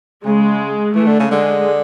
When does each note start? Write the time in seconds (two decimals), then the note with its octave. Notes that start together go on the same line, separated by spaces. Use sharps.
0.25 C#3 G#3
0.95 E3 A3
1.07 D3
1.19 C#3
1.29 D3 G#3